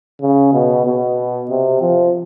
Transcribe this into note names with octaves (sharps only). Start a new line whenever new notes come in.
C#3
B2
B2
C3
F3